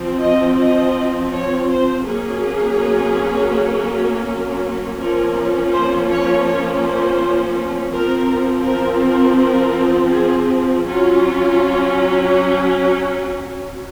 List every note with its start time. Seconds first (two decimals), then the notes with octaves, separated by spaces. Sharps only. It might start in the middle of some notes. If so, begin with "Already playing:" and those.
Already playing: F3 C4
0.21 D#5
0.57 D#5
1.31 C#5
1.68 C5
2.04 F#3 A#3 C#4 G#4
4.98 F3 A#3 C#4 A#4
5.72 C5
6.09 C#5
6.45 C#5
6.82 C5
7.92 F3 C4 A#4
8.65 A#4
9.02 A#4
9.38 A#4
10.12 G#4
10.85 F#3 C#4 F4